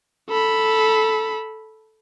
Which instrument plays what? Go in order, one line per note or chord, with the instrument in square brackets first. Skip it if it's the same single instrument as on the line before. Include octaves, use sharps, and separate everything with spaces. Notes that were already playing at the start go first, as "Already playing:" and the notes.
[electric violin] A4 B5